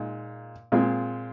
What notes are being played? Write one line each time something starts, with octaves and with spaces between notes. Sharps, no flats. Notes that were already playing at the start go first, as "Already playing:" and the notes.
Already playing: A#2 G#3 D#4
A#2 G#3 C4 F4